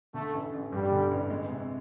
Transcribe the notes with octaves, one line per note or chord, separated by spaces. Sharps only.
D3 A3
A1
A1
G2 G3
D3
A1
G#3
C3